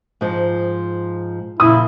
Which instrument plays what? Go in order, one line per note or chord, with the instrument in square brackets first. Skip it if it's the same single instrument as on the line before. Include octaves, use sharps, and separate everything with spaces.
[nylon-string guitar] G#2 F3
[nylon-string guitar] A#2 C#3 F3 [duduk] E4 [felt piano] D#6